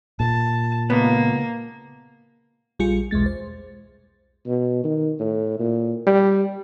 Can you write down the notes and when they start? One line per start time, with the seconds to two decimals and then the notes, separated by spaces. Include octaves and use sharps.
0.20 A#2 A5
0.90 C#2 A#3 B3
2.79 A#1 G3 F4 G#4 C#7
3.11 B1 E2 G#3 A6
3.26 C5
4.47 B2
4.84 D#3
5.20 A2
5.59 A#2
6.07 G3